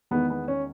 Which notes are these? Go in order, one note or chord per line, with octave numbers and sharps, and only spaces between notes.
E2 D#3 G#3 B3
B3
C#4